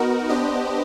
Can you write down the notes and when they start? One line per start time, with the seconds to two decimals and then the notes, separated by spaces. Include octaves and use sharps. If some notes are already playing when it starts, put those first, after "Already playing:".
Already playing: B3 D#4 F#4 A#4
0.29 B3 D4 G4 C5 D#5